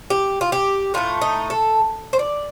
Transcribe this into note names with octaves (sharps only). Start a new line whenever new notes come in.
G4
F4
G4
A2 A3 F4
D#4
A4
C5
D5